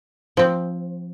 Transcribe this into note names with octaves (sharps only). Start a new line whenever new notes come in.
F3 C4